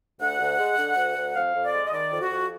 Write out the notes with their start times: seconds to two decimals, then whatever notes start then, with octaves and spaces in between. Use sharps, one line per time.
0.20 D2 F#5
0.40 D2
0.58 G#3
0.77 D3
0.96 D2
1.16 D2
1.35 F2 F5
1.55 F2
1.65 D5
1.73 G#3
1.86 D#5
1.93 D#3 D5
2.13 F2
2.21 F#4
2.31 F2